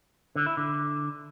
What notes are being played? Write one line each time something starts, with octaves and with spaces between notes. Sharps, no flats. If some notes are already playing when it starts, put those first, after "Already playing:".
D3
E4
D3